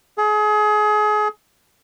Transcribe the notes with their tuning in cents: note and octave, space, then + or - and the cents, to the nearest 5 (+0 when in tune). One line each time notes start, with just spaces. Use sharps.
G#4 +30